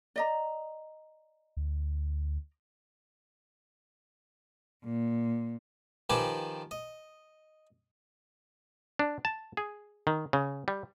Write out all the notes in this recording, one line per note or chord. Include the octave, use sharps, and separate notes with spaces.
D5 D#5 A#5
D2
A#2
D#3 F3 G4 B4 G#5 D6
D#5
D4
A5
G#4
D#3
C#3
G3